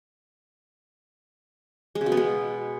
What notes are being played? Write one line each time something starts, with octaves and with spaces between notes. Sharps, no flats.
G#3
C#3
B2
B3
G#3